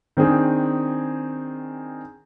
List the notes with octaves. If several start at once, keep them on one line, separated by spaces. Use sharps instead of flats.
D#3 C4 D4 G#4